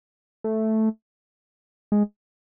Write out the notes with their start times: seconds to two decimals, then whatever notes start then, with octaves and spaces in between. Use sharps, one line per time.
0.44 A3
1.92 G#3